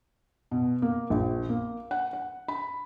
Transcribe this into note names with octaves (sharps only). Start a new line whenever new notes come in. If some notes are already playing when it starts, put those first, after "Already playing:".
B2
A#3
A#1
A#3
F#5
F#5
B5